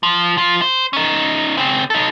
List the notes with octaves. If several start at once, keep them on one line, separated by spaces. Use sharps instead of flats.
F3
F3 F4
C5
C#4 D#4
C#3 C4
D#4 A4